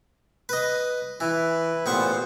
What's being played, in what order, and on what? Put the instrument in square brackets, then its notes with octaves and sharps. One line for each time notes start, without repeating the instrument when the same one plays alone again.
[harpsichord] B4 D#5
[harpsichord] E3 [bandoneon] E4 B4
[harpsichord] A1 B3 C#6 [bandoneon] A#2 C5